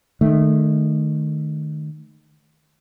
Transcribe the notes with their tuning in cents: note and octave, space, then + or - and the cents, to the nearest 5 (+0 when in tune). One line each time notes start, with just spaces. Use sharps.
D#3 -25 A3 -15